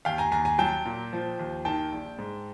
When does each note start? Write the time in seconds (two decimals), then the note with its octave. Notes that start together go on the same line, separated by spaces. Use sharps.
0.05 D#2 F5 G5
0.18 G#5 A#5
0.32 D#2 G#5 A#5
0.45 G#5 A#5
0.58 F#3 G5 A5
0.85 A#2
1.13 F3
1.39 D#2
1.65 D#3 G5 A5
1.92 A#1
2.19 G#2